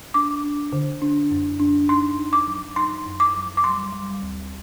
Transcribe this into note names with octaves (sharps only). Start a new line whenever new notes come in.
D4 D6
D4
D3
D4
F#2
D4
D#4 C6
D#4
D6
F#3
D#4 C6
F#2
D6
F#3
D6
G3 C6
G3
D2